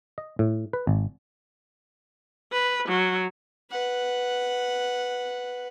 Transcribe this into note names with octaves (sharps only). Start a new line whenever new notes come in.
D#5
A2
B4
G#1
B4
F#3
B4 F#5